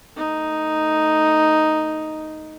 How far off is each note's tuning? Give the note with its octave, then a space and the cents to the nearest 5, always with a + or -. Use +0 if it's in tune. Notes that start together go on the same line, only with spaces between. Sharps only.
A3 +0 D#4 +0